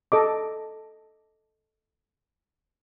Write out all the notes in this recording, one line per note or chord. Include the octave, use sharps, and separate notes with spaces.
A4 D#5 D6